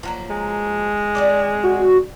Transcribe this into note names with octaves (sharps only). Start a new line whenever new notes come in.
F3 F#3 A#3
G#3
C4 G#4 D5
F#4